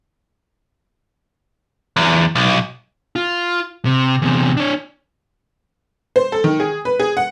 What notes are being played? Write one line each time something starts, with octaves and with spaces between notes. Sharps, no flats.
E2
B1
F4
C3
E2 C3
D4 C#5
C5
A4
D#3
G#4
B4
G#4
F#5